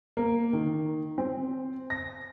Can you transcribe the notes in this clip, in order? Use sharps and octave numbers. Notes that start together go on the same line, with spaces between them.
A#3
D#3
C4
A#6